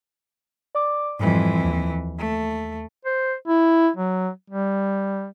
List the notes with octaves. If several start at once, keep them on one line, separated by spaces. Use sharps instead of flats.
D5 D6
F2 G#2 E3 G3
D#2
A3
C5
E4
F#3
G3